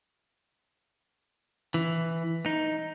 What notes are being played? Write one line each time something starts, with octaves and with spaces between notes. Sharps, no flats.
E3
D#4